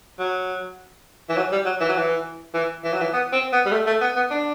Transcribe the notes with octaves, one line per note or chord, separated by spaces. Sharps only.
F#3
E3
F#3
G3
F#3
E3
F#3
E3
E3
E3
F#3
E3
B3
C4
B3
G3
A3
A3
B3
B3
D4